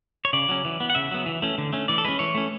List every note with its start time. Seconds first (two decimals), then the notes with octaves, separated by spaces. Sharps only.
0.25 C#5
0.33 C#3 D5
0.49 F#3 C#4
0.65 E3
0.80 B3
0.90 F#5
0.95 C#3 E5
1.11 F#3 B3
1.26 E3
1.42 A3 C#4
1.58 D3
1.73 A3 C#4
1.88 E3 D5
1.98 A4
2.04 G#3 C#4 B4
2.19 E3 C#5
2.35 A3 C#4